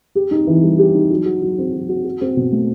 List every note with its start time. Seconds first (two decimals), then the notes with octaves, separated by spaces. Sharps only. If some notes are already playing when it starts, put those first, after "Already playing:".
0.15 G4
0.31 D#4
0.47 E3
0.62 G3
0.79 G4
0.95 D#4
1.10 F#3
1.25 F#4
1.42 F#3
1.58 C4
1.73 F#3
1.89 F#4
2.04 F#4
2.21 C4
2.37 B2
2.52 A3